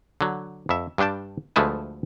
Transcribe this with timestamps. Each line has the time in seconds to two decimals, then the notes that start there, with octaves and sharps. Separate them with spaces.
0.21 D3 F#3
0.69 F2 E5
0.98 G2 G3 D4 G5 A5
1.56 D2 F3 G#3 A3 B4 A5